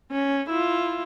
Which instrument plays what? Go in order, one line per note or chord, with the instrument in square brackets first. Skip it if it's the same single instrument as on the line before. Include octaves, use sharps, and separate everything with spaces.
[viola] C#4
E4 F4